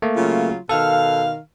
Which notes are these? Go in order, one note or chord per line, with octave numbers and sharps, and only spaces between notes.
A3 A#3
C#3 F#3 F4
B2 D#3 A4 F5